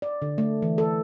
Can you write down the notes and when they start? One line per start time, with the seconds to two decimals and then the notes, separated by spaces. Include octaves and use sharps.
0.02 D5
0.22 D3
0.38 A3
0.62 E3
0.78 A4